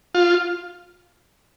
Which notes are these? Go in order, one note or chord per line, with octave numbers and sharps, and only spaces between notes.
F4